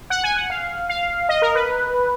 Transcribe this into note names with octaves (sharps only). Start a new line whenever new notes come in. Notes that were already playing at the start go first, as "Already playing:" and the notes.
F#5
G#5
F#5
F5
F5
D#5
A#4
B4